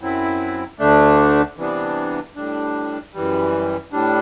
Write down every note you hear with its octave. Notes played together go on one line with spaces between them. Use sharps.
F#2 F#3 C4 E4
D2 D3 A3 D4
C3 E3 G3 B3 D4
A2 G3 D4
F#2 E3 G3
A2 G3 D4